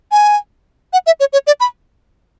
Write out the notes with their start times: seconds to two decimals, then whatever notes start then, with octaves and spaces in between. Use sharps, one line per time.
0.11 G#5
0.93 F#5
1.06 E5
1.20 C#5
1.33 C#5
1.47 D5
1.60 B5